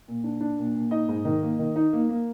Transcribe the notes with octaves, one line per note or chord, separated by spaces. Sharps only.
A#2
D4
D4
A#2
A#2
D#4 D#5
G#2
D#3
A#3
D#3
D#4
A#3
A#3